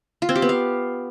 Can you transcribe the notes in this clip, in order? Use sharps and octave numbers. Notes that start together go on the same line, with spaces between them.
F4
C4
G4
B3
F5